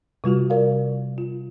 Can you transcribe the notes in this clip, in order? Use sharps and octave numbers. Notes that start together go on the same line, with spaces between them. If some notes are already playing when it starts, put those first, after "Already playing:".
C3 G3 F4 F#4
A#4 D5 F5
F4